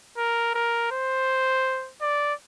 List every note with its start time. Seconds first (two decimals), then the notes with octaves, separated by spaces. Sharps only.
0.18 A#4
0.55 A#4
0.92 C5
2.01 D5